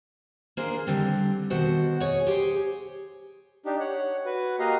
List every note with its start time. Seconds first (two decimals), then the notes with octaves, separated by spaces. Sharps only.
0.57 A#3 D4 G#4 C5
0.87 D3 G3 C4
1.50 B2 D#3 F#4 C5 F#5
2.00 G#4 C#5
2.27 G4 G#4 C5
3.66 D4 D#4 G4
3.80 C#5 F#5
4.25 F#4 B4
4.59 A#3 F#4 G4 D#5 F5 A#5